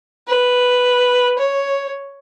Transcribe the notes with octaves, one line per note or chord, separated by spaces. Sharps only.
B4
C#5